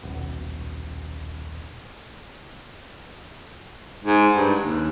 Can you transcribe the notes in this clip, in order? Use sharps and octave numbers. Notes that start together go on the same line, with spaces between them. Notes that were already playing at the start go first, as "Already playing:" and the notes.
D#1 B1
G#2
G2
D#2